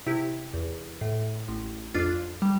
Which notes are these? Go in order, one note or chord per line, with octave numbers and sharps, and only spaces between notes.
C3 E4 G4
E2
A2
A1
F2 D4 F4
G3